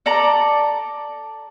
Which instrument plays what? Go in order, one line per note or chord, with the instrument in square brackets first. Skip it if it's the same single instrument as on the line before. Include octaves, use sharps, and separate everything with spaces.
[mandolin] A4 D5 A#5